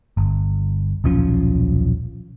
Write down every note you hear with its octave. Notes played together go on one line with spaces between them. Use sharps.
G1
D#1 B1 F3 C#4